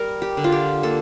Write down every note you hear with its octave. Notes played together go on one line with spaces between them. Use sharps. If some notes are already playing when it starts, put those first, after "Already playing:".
Already playing: G3 A#4
G4
D3
F4
G4
A#3 A4